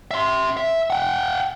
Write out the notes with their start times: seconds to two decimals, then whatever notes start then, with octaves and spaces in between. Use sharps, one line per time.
0.11 E5 C6
0.57 E5
0.90 F#5 G5